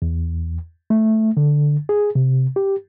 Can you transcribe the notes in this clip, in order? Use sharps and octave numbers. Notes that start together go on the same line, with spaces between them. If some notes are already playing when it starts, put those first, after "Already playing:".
E2
A3
D3
G#4
C3
G4